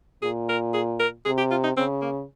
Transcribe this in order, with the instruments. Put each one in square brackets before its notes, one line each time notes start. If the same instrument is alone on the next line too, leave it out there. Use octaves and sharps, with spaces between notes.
[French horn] A#2 [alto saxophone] G#4
[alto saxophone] A#4
G#4
A#4
[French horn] C3 [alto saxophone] G#4
[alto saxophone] G4
F4
D#4
[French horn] C#3 [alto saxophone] C4
[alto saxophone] A#3